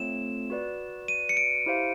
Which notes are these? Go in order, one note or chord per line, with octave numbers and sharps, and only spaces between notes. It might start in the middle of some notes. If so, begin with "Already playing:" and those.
Already playing: A3 C4 F4 A4 C#5 E7
F#4 B4 D5
D#7
C#7
D7
E4 G4 C5 F5